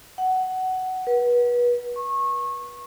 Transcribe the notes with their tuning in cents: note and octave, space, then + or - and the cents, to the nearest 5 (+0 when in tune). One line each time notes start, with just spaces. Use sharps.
F#5 +15
B4 -30
C#6 -25